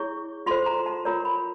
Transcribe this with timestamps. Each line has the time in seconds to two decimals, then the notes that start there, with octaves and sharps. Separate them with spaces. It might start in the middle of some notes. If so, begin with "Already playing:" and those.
Already playing: E4 G#4 C#5 C#6
0.46 F4 A4 C5 C6
0.66 A#5
0.86 A5
1.05 F4 A#4 C#5 A#5
1.25 B5